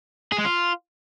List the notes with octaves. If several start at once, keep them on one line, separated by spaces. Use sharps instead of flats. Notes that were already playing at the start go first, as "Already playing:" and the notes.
G#4
G#3
F4